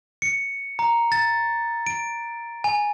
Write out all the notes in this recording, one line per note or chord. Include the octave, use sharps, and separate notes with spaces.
C#7
A#5
A6
D7
G#5